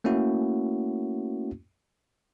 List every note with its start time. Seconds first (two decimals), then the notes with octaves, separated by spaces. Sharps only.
0.04 A3 A#3 C#4 E4 F#4